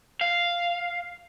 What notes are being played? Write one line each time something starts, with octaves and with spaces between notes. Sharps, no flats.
F5